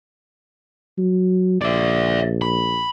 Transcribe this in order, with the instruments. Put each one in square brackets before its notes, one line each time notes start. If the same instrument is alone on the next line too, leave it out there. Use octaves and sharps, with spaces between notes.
[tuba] F#3
[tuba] A#1 [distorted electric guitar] D5 E5
[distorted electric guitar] B5